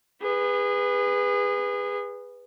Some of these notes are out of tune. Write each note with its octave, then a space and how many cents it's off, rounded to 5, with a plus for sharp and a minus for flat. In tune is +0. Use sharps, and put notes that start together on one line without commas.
G#4 -30 B4 +0